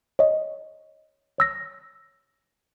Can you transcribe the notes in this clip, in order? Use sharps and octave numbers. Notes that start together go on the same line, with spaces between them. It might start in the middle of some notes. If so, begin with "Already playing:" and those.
C#5 D#5
C#5 E6 A#6